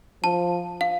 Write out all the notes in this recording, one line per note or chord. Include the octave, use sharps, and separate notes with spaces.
F3 A5
F5